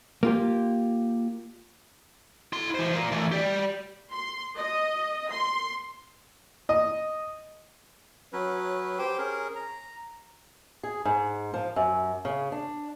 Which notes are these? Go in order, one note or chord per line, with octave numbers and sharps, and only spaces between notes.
A#3 F4 G4
E4 C6
E3 C5
F4 A#4
E3 A3
G4 D5
C6
D#5
C6
D#5
F#3 C#4 B4
G4 C5 G5
C#4 G#4 A#4
A#5
G#4
G#2
F3
F#2
C#3
D4